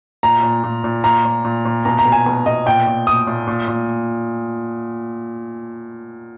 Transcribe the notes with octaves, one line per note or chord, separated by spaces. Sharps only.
A#2 A#5
A#2
A#2
A#2
A#2 A#5
A#2
A#2
A#2
B2 A#5
A#5
B2
G#5
B2
B2 D#5
A#2 G5
A#2
A#2 D#6
A#2
A#2
A#2